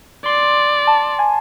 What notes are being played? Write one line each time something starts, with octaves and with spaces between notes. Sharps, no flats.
D5 C6
A5
G#5